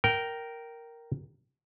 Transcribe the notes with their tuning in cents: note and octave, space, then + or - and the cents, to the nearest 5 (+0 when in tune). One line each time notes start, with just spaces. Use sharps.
A#4 +0 G5 -15